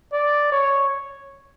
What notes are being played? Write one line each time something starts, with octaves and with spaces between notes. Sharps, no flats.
D5
C#5